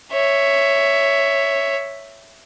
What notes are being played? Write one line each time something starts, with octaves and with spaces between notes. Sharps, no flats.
C#5 E5